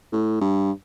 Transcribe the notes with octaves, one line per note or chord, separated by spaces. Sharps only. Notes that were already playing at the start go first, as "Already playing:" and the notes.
A2
G2